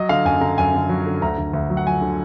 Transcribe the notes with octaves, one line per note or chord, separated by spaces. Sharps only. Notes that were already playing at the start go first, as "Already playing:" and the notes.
Already playing: F#3 D#5
D3 F5
F#2 G#5
D3 A#5
F#2 G#5
D3
F#3
D3
D2 A#5
D2
D2
F#3
F#5
F#3 G#5
D3